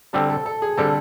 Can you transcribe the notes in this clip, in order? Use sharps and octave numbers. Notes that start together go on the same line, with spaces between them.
D3 G3 C4 A4
A4
A4
G#4
D3 G3 C4 A4